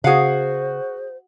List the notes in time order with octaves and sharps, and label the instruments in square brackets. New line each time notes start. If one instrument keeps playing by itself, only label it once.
[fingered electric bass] C#3 [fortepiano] F#4 F#5 [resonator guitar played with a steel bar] G#4 F5 [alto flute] C5